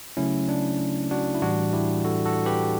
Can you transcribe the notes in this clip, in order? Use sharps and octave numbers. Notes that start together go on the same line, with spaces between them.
C#3 F#3 A3 C#4 E4
D4
D4 F#4
E4
A2 E3 G3 D4 F#4
E4 G4
F#4 A4
F#4 A4
G4 B4